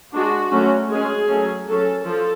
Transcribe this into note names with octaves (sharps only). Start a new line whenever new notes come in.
G#3 D4 F#4
D3 F#3 A3 C#4
G#3 C#4 G#4
F#3 A3 C#4
F#3 C#4 A4
F3 A4